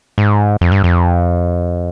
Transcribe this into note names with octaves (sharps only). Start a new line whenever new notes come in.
G#2
F2
G2
F2